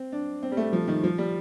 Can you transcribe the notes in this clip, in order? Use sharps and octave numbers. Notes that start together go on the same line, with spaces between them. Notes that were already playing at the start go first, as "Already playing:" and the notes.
Already playing: C4
D4
C4
G3
A3
F3
D#3
F3
G3